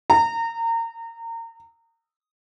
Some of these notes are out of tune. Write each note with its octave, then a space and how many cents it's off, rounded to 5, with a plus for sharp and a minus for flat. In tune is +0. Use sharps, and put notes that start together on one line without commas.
A#5 -30